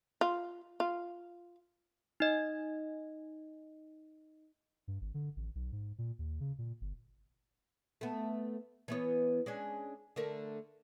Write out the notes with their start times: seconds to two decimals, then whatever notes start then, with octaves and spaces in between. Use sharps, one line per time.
0.21 F4
0.80 F4
2.20 D#4 D#5
4.88 G2
5.01 G#1
5.14 D3
5.36 A1
5.55 B1
5.72 G#2
5.98 A#2
6.19 D#2
6.40 C#3
6.58 A#2
6.81 G1
8.01 A3 B3
8.88 E3 B3 C#5
9.46 G#3 C#4 D4
10.16 D3 A3 A#4